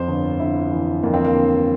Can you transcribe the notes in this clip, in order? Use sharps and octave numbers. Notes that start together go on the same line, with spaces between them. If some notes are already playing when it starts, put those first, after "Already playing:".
Already playing: F2 C5
G1
G1 E4
E3
F2 A#3
C4
A#3
G1